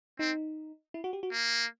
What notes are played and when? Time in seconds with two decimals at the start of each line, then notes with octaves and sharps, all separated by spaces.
0.19 C4 D#4
0.94 E4
1.04 F#4
1.13 G4
1.23 F#4
1.32 A#3